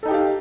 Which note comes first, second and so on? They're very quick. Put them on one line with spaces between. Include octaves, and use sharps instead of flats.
A4 D#4 G5 G4 F5